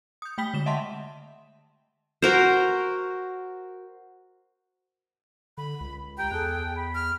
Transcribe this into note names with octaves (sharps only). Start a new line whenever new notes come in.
D#6 G6
A3 G5 B5 B6 G7
D3 G#3 E7
D#5 E5 F#5 A5 C6
F#4 A#4 C5
D3 B5
C#2
G4 G5 A#5 G6
E2 G#4 A4 F#6
B5
F6